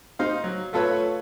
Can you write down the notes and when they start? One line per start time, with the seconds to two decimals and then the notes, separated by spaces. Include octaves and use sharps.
0.19 D#4 C5 F5
0.44 F#3
0.73 A3 F4 A4 B4 C#5